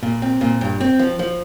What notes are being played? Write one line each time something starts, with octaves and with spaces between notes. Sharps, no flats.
A#2
C4
A#2
G2
C4
F3
F3